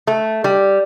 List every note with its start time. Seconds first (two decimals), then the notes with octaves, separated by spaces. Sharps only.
0.07 A3
0.44 G3